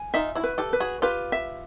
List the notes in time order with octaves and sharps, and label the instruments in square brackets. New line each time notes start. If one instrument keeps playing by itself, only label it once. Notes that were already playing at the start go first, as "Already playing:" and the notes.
Already playing: [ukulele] G#5
[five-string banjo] D#4 F4 [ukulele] E5
[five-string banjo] E4 F#4
[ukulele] B4
[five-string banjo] G4 A4
[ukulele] B4
[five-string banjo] F#4 G#4
[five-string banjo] F4 G4 [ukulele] B4
[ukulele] E5